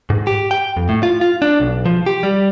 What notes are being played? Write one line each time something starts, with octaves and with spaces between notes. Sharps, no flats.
G#2
G4
G5
F2
A2
F4
F4
D4
B1
F3
G4
G3